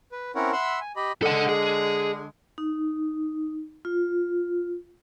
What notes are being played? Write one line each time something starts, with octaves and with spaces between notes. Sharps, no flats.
B4
C4 C#4 E4 A#4 C#5 F#5
E5 F#5 B5 C6 E6
G#5
G4 D#5 B5
D3 G#3 A4 F#5
G#4
D#4
F4